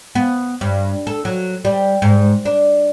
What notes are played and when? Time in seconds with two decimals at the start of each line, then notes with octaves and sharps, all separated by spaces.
0.15 B3
0.61 G2
1.07 A4
1.25 F#3
1.65 G3
2.02 G#2
2.45 D4